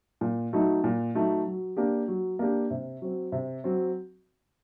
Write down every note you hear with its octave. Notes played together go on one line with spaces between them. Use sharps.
A#2
F#3 A3 D#4
A#2
F#3 A3 D#4
F#3
A#3 D4 G4
F#3
A#3 D4 G4
C3
F#3 C4
C3
F#3 C4